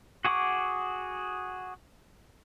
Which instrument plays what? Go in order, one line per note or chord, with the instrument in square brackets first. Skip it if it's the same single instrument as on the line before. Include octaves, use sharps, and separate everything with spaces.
[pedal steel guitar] F#4 G#4 F#5 C#6 D6